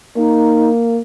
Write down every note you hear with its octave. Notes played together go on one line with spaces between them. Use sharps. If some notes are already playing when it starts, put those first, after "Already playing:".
A#3 D#4